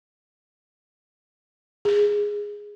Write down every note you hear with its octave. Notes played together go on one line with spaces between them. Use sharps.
G#4